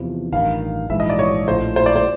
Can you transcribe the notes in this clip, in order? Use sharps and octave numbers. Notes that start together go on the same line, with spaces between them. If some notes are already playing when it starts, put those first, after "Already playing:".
Already playing: E2 C3 F3
A1 G2 D#3 F5
A#1 G#2 E3 E5
D#5
D5
C#5
A#1 A2 F3 C5
C5
D5
C5